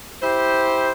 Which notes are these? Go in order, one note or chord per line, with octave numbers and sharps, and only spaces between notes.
E4 G4 C5